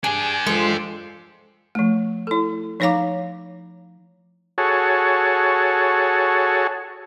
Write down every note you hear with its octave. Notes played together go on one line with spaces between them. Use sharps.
D4 G4 G#4 G#5
F3 G#3 A4
F3 A3
E4 A4
F3 D#4 C#5 F5 A#5 D6
F#4 G#4 A4 C#5